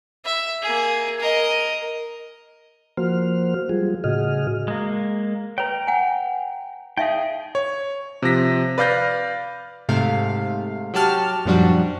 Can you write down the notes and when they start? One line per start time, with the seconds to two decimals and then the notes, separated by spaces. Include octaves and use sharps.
0.25 E5
0.62 A#3 G#4
1.20 A#4 D#5
2.97 F3 A#3 F#4 C5 F6
3.69 F#3 G3 F4 G#4
4.04 A2 C#3 F#4 G#4 D#5 F6
4.68 G#3 A#3
5.58 B4 C#5 G5 A#5
5.87 F#5 G#5
6.98 D#4 G#4 E5 F5 G5
7.55 C#5
8.22 C3 F3 A#6 B6
8.78 B4 D5 F5 F6 G6 A#6
9.89 G#2 C3 A3 F5
10.94 F#3 F#4 G4 A5 F6
11.45 F#2 A#2 F3 G3 D4 F#4